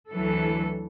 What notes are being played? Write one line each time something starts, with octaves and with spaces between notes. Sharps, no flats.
D2 E3 F#3 A4